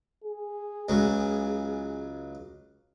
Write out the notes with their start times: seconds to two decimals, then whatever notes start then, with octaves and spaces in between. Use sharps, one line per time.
0.24 G#4
0.89 C#2 F#3